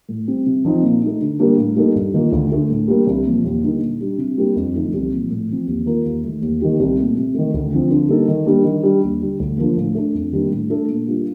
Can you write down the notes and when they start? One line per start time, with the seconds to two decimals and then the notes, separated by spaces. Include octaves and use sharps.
0.09 A2
0.28 G3 C4
0.46 C3
0.65 F3 C4 D#4
0.83 A#2
1.02 A3 D#4
1.21 D3
1.39 G3 A#3 D4
1.58 A2
1.76 G3 A#3 D#4 A4
1.95 G2
2.14 D#3 A#3 F4
2.32 D2
2.52 D3 A3
2.70 A2
2.88 G3 A#3 D4
3.07 C2
3.26 A#2 F3
3.44 D#2
3.62 D3 G3 A#3 D#4
3.81 A#2
4.01 G3 D4
4.18 C3
4.38 G3 A#3 D4 G4
4.56 F2
4.74 D3 F3 A3 D#4
4.94 C2
5.12 A#2 F3
5.31 A2
5.49 F3 C4
5.67 D#2
5.86 D#3 A#3 F4 A#4
6.05 D#2
6.23 D#3 A3
6.42 D#2
6.61 D#3 A#3 D#4 G4
6.80 C2
6.98 A#2 A3
7.17 C3
7.34 D#3 A3
7.54 D2
7.72 D3 F3 C4
7.90 D3
8.09 G3 A#3 D#4 A4
8.28 D#3
8.46 G3 A#3 D4
8.65 D#3
8.84 G3 D4
9.03 D#2
9.21 D3 G3
9.39 D2
9.58 D3 F3 A#3
9.77 A2
9.95 A3 D4
10.15 F2
10.32 D#3 G3 A#3 D4
10.51 A2
10.70 A3 D4 A4
10.89 A#2
11.07 G3 A#3 D4 F4